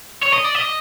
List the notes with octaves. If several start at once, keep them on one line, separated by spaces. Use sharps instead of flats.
C#5
D#5
D5
D#5